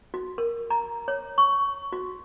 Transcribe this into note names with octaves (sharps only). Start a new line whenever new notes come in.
F#4
A#4
A#5
C#5
C#6
F#4